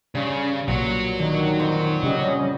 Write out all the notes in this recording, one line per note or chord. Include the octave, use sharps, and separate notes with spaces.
G2 C#3
B1 A#2 F#3 C#5
D3 D#3
F2 C6
C#3 G3 C#4 D#5